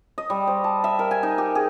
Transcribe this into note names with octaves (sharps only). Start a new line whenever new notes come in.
D#5
G3
C5
A5
E5
A#4
G#5
D#4
G4
G#4